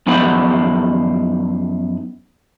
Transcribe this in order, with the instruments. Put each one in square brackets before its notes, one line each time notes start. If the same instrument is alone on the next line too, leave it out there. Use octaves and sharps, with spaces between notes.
[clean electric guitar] F#2 F3 B3 D#4 C5 F#5